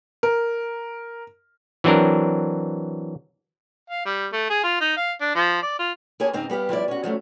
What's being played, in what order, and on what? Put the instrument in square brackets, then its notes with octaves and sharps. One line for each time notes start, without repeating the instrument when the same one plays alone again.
[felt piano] A#4
[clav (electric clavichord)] E3 F#3 C4 D4 A#4
[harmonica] F5
G3
A3
G#4
F4
D#4
F5
D4
F3
D5
F4
[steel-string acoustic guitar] A#3 G4 G#4 C#5 G#5 A5
G#2 C#3 C4 D#4
G3 B3 G4 F5
F3 G3 E4 D5
C#4 F#4
F3 F#3 A3 C#4